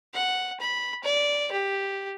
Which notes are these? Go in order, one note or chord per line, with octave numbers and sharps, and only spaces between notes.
F#5
B5
D5
G4